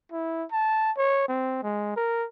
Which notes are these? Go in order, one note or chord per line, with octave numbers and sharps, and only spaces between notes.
E4
A5
C#5
C4
G#3
A#4